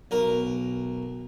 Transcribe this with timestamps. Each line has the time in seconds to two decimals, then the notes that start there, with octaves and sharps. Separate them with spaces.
0.11 B1 A#4